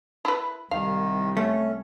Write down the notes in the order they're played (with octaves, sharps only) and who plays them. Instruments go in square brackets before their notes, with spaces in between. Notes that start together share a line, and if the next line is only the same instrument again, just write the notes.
[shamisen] E4 B4
[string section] C2 [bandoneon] D#3 [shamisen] F5
[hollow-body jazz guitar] A3 [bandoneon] C#4